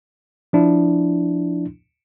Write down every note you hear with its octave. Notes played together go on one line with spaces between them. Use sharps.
F3 D4 E4